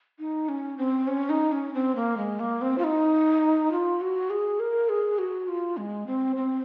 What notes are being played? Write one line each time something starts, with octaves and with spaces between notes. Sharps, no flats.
D#4
C#4
C4
C#4
D#4
C#4
C4
A#3
G#3
A#3
C4
F4
D#4
F4
F#4
G#4
A#4
G#4
F#4
F4
G#3
C4
C4